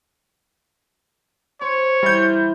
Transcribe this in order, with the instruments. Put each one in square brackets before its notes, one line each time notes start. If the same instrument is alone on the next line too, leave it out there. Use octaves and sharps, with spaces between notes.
[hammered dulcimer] C5 [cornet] C#5
[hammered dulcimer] E3 [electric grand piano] G3 G6